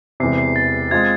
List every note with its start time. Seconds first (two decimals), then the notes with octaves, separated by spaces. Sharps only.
0.20 E1 E2 C3 C7
0.38 C7
0.56 A6
0.91 G#3 C4 F4 G#6